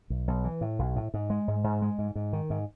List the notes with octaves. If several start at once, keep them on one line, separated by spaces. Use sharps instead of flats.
B1
B1
E3
A2
B1
A2
G#2
G#3
G#2
G#2
G#3
G#2
G#2
D#3
G#2